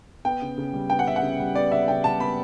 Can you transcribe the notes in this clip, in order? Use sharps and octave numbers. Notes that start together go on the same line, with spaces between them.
B3 G5
C#3
C#3
G3
B3 G5
F#5
C#3 E5
F#5
C#3
G3
B3 D5
C#3 E5
C#3 G5
G3 A5
B3 B5